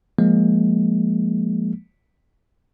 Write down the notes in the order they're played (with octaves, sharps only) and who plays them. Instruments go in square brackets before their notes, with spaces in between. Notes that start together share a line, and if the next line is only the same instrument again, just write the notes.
[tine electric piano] F3 G#3 A#3